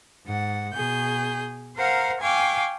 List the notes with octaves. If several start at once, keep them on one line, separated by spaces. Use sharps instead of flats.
G#2 F#5
B2 G#4 G6
A#4 C5 F5 F#5 A#5
F5 G5 G#5 C#6 D6